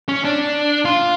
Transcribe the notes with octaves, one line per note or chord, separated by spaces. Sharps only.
C#4
D4
F4